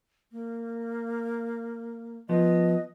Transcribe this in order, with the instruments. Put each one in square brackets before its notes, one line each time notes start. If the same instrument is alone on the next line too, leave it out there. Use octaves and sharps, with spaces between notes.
[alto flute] A#3
[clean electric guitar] F3 B3 [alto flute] D#5